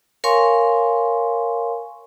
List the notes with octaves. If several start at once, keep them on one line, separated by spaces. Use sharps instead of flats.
A#4 C#5 F5 G#5 C6 C#6